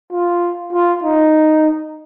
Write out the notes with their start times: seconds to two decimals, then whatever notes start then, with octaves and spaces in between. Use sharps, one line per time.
0.12 F4
0.73 F4
1.04 D#4